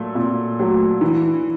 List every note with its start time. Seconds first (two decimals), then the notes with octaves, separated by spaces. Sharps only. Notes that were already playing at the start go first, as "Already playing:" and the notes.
Already playing: A#2 F#3 A3
0.15 A#2
0.59 F#3 A3
1.01 E3